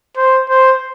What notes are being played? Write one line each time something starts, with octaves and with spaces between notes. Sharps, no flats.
C5
C5